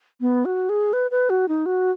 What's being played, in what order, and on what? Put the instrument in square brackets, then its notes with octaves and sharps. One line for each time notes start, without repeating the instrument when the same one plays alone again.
[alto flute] B3
F#4
G#4
B4
B4
F#4
D#4
F#4